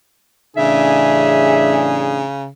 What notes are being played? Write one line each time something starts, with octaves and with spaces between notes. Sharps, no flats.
A1 C#3 D4 G#4 E5